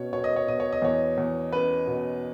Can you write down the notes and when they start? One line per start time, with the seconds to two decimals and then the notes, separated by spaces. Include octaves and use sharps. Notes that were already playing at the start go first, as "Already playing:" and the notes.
Already playing: B2 C#4 C#5
0.13 B2 C#5
0.24 D#5
0.36 C#5
0.48 B2 D#5
0.60 C#5
0.72 D#5
0.82 E2 C#5
1.18 E2
1.52 C#4 B4
1.87 B2